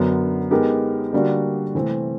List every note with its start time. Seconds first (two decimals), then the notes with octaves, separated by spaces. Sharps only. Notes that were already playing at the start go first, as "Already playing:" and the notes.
Already playing: F#2 D3 F#3 B3
0.51 G#3 B3 D#4 G4 A#4
1.13 D3 G3 A#3 D4 F#4
1.75 C3 E3 A3 C4